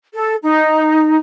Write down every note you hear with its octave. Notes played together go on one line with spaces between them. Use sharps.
A4
D#4